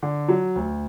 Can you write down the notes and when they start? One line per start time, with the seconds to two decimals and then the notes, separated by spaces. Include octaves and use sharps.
0.03 D3
0.28 F#3
0.56 D2